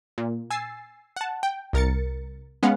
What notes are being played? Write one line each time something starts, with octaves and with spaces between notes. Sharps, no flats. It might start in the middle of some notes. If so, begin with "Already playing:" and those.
A#2
G#5 E6 A6 C7
F#5 A5
G5
C2 A#4 A6 C#7
G#3 B3 C#4 F5 F#5